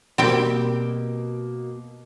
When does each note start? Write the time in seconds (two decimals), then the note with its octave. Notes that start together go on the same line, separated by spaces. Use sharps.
0.18 B2 G3 A#3 C4 G4